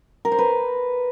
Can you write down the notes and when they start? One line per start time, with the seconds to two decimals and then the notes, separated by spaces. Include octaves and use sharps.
0.25 A#4
0.32 C5
0.39 B4